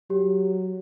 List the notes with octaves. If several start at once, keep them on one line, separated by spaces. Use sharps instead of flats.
F#3 G4